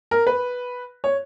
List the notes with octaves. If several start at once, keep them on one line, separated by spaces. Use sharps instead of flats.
A#4
B4
C#5